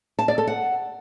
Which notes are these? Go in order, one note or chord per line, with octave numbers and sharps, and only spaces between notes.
A5
D5
A4
F#5